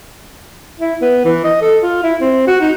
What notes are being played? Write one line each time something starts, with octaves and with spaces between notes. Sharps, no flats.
E4
B3
E3
D#5
A4
F4
E4
C4
F#4
D#4